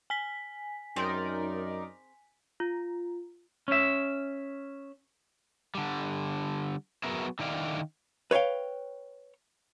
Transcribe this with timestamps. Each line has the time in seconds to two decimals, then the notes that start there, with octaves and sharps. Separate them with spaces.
0.10 G#5 B6
0.96 F#2 C4 D#4 G#4 A#4 C5 D5
2.60 F4
3.68 C#4 E5
5.75 D3 G3
7.04 F#3 B3 F#4 G#4 A#4 E5
7.39 D3 D#3 E4 D5 F5
8.31 B4 C#5 E5 F5 G5